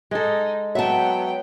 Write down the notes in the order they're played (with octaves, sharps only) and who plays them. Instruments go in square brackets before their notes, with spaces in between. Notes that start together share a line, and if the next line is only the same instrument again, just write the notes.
[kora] G#3 A4 [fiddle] D#4
[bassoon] F#3 [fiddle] B3 G5 [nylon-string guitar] E5 A5